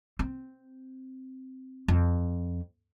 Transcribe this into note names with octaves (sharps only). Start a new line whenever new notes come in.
C4
F2